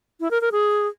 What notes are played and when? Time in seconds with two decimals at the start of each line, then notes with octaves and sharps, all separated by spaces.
0.20 E4
0.31 A#4
0.41 A#4
0.52 G#4